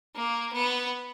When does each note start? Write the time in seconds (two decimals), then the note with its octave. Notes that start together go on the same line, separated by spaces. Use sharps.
0.15 A#3
0.53 B3